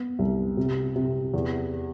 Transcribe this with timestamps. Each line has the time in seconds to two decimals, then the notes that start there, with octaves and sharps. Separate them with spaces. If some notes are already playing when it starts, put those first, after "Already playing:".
Already playing: B3
0.19 C2
0.57 C3
0.96 C3
1.34 E2